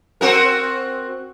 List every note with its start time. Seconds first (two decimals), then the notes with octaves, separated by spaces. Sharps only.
0.21 C4 F#4 A#4